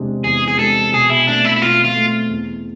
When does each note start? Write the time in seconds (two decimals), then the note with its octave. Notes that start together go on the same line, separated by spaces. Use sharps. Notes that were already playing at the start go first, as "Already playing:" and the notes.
Already playing: E2 C3 G#3 D4
0.24 E2 G#4
0.48 G#4
0.58 C3 G#3 D4 A4
0.93 B2 G#4
1.10 E4
1.27 A3 C4 D4
1.45 E4
1.56 E4
1.62 B2 F4
1.85 F4
1.95 A3 C4
2.30 E2